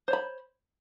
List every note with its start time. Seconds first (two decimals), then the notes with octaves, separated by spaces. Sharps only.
0.08 C5
0.11 C#5
0.13 B5